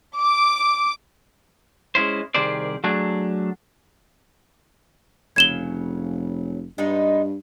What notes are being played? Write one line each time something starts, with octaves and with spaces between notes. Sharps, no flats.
D6
G#3 C#4 E4 C5
C2 D#3 G4 G#4 C5 D5
F#3 A3 D4 G#4
F1 C#3 F#3 G#6 E7 G7
G2 G#3 B3 D#4